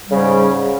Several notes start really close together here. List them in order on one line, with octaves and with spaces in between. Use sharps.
G3 C#3 G#2